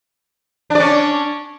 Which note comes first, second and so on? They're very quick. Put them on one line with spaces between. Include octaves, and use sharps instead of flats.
D4 D5 C#4